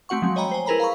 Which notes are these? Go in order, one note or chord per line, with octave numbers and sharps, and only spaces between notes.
A3 C4 F#4 F#5 C#6
F3 F#3 G#3 C4
C#5 D#5 G5 A#5 B5
C5 G#5
E4 G#4 A#4 B4 A#5 B5
F5 A#5 B5 C#6